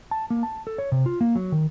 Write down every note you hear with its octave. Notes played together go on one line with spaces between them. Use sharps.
A5
A#3
A5
A4
C#5
C3
F4
A#3
F#3
D#3